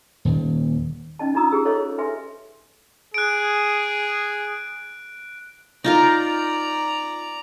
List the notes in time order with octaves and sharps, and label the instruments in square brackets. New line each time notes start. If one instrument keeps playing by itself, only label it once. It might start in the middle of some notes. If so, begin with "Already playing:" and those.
[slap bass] D#1 D#2
[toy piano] C#4 D#4 D#5 A5
D4 D#4 F4 A#5 D#6 E6
G4 G#4 C5 E6
A4 C5 C#5 D#5 F5
B4 E5 G#5 C6
[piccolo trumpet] G#4 [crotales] F#6 D7
[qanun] D#4 F4 A#4 [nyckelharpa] D5 A#5